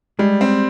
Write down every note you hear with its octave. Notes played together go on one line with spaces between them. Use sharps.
G3 G#3
C4